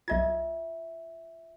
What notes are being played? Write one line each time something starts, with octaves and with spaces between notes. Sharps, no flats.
B1 F4 D#5 E5 G#6